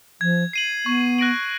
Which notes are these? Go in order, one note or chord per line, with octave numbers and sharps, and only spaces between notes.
F3 G#6
C7 D#7 F#7
B3 C#6
F#6 A#6 D7 F#7